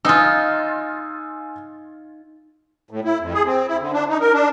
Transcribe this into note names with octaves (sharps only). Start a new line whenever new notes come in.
D#4 F4 G#5 D#6 E6
A2
E4
F2
G#4
C4
E4
D3
D4
D#4
A#4
D4